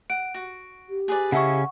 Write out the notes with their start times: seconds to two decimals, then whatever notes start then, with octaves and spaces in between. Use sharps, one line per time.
0.10 F#5 D7
0.34 F#4
0.89 G4
1.08 G#4 B4 D5
1.32 C#3 C#4 E4 A4 D#5 F#5 C#6